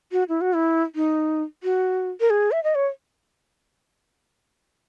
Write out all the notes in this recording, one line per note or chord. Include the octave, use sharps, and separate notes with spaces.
F#4
E4
F#4
E4
D#4
F#4
A#4
G#4
E5
D#5
C#5